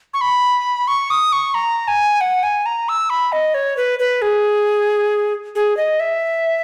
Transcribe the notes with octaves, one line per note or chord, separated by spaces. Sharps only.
C#6
B5
C#6
D#6
C#6
A#5
G#5
F#5
G#5
A#5
E6
B5
D#5
C#5
B4
B4
G#4
G#4
D#5
E5